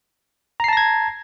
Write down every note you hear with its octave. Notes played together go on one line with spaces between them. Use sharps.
A5 A#5 G#6 A#6 C7